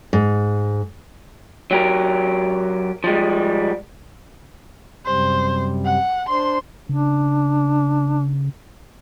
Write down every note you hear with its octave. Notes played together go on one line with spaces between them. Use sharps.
G#2
F#3 G4 A#4
F3 G3 G#3
F#2 C3 G3 C5
F#5
D4 C5 C6
C#3 D4